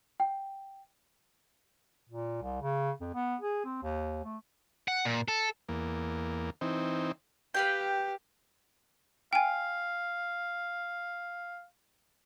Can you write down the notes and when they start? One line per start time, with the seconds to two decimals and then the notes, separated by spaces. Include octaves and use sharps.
0.20 G5
2.09 A#2
2.42 C2
2.62 C#3
3.01 F2
3.14 B3
3.41 G#4
3.65 C4
3.83 D#2
4.24 A3
4.88 F#5
5.05 A#2
5.28 A4
5.69 E2 A#3
6.61 E3 C4 D#4
7.54 G4 B4 F5 G5
9.33 F5 G5 G#5